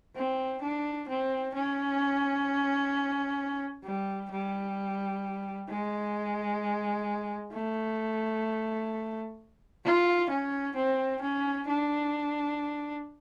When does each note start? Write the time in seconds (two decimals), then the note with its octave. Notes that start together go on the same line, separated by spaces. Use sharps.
0.16 C4
0.62 D4
1.08 C4
1.54 C#4
3.84 G3
4.31 G3
5.69 G#3
7.53 A3
9.84 F4
10.30 C#4
10.76 C4
11.22 C#4
11.69 D4